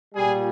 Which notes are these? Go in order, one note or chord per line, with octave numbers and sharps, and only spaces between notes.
A#2 G3 G#4